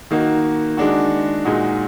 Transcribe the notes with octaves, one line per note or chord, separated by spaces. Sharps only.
D#3 A#3 D#4 F#4
D#3 G#3 D4 F#4
A#2 G#3 D#4 F#4